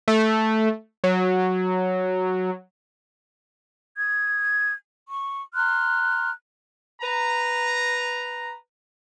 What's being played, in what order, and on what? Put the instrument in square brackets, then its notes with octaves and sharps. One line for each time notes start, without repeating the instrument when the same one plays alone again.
[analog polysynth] A3
F#3
[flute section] D#6 G#6
C#6
A#5 C6 F6 F#6
[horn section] B4 A#5